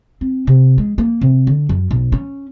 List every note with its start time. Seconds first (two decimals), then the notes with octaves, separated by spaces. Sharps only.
0.21 C4
0.47 C3
0.78 G#3
0.98 A#3
1.21 C3
1.47 D3
1.69 F#2
1.91 B1
2.12 C#4